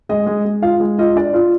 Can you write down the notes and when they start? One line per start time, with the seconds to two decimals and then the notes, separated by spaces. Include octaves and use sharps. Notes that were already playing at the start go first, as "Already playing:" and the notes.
0.09 G#3 D#5
0.26 G#3
0.45 G#3
0.62 F4 F5
0.80 G#3
0.99 F4 D#5
1.16 D4 D5
1.34 F4